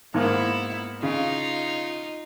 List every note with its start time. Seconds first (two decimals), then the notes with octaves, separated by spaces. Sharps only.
0.14 G#2 A#3 B3 E4
1.03 C#3 D#4 F4